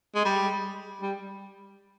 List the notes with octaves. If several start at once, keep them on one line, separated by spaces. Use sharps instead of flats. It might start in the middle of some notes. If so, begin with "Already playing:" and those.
G#3
G3
G3